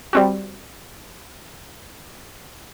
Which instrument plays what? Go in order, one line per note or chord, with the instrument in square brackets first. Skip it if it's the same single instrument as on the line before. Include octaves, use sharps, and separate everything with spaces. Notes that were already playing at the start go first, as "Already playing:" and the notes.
[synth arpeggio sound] G3 C4 F#4